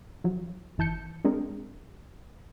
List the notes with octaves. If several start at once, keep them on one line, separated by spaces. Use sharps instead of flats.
F3 F#3
G1 E3 A5 G6 C#7
G#3 C4 D4 G#4 A#4